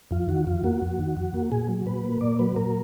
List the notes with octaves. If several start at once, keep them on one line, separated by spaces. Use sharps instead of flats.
F2 F4
D#3 F#4
F2 F4
A#3 F#4
F2
D#3
F2
A#3
A#2 G#4
F#3
A#2 B4
A#3
A#2 D5
F#3 B4
A#2 A#4